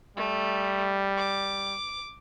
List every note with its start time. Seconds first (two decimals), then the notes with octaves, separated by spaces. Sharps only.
0.17 G3 A3
1.17 D6